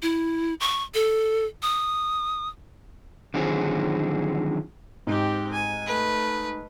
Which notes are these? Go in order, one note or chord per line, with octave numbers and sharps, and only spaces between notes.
E4
C#6
A4
D#6
D3 D#3 F3 F#3 C4 G#4
G#2 C4 G4
G#5
A3 B4